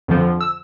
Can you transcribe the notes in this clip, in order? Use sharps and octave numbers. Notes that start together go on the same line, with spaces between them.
F2 D3 F3
E6